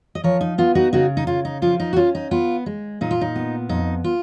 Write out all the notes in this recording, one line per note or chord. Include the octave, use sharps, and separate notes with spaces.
D#5
F3 A#4 C#5
D#4
B3 F4
D#4 F#4
C#3 D#4 F#4
D#4
C#3 F4
D#4
F3 F4
D#4
F#4
C#4 F4
D#4
B3 F4
G#3
A#2 D#4
F4
D#4
B3
F2 D#4
F4